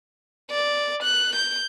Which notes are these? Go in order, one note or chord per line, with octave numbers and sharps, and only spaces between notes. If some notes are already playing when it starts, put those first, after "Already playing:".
D5
F#6
G6